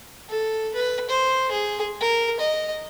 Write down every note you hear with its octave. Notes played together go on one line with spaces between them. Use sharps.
A4
B4
C5
G#4
A#4
D#5